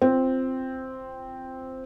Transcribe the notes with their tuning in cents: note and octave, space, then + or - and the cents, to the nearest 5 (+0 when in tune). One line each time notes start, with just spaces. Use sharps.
C4 +0 F4 -15